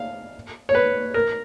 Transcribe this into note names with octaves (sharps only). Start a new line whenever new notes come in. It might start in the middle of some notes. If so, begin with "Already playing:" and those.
Already playing: F5
C#5
B4
A#4